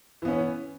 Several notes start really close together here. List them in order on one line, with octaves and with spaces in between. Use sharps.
E3 B3 C#4